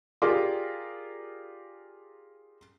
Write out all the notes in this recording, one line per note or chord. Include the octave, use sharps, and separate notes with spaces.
F4 G4 G#4 A#4 D5